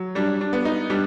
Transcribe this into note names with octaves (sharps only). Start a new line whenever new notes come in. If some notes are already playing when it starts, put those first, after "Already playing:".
Already playing: F#3
G3 D4
D4
B3
D#4
G3 D4